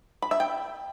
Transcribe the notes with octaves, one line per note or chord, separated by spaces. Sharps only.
B5
E5
G5